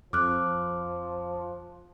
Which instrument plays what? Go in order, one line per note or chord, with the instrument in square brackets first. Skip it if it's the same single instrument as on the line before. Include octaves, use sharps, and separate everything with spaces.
[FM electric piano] F2 [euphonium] F3 [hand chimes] D6 F6 F#6